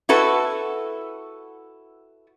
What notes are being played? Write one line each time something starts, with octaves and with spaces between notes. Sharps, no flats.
E4 F#4 A4 B4